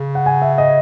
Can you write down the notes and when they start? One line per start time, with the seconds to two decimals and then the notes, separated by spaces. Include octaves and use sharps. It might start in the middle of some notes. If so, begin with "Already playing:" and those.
Already playing: C#3
0.15 F#5
0.26 G#5
0.42 E5
0.58 D#5